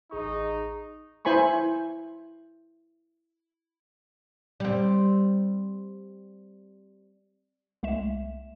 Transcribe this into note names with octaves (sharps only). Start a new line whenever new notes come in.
A1 D#4 G#4 C#6
E4 C5 G#5 B5 C#6
G3 C4
C2 G#3 A3 E5 E7